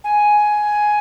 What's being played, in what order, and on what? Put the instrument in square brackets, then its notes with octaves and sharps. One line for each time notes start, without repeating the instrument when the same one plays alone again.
[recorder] G#5